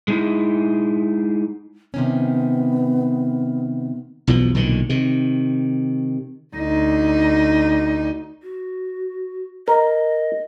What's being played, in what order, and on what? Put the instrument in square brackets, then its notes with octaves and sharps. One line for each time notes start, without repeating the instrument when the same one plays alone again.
[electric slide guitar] G#3 D#4 E4
[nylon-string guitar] C3 D#3 C#4 [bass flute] B3
[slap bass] B1 E2 B2 F3
B1 A#2 D3 D#3
C3 D#3
[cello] D2 D#4
[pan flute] F#4
[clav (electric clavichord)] A#4 [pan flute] D#5